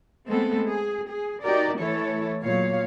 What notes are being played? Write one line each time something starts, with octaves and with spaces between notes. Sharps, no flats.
G#3 A3 B3 C4 A4
G#4
G#4
D#4 F#4 G4 A#4 D5
E3 A3 E4 A4 C#5
E2 A#2 F#3 C#5 F5